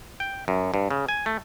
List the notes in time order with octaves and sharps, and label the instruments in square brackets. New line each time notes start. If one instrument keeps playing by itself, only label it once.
[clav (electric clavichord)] G5
F#2
G2
C#3
G#5
A3